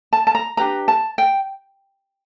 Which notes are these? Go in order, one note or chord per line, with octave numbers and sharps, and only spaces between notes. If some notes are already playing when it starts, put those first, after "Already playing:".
A5
A5
A#5
D4 G4 B4 A#5
A5
G5